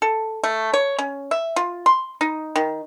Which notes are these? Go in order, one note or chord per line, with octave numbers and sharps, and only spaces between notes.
A4
A3
C#5
C#4
E5
F4
C6
D#4
D#3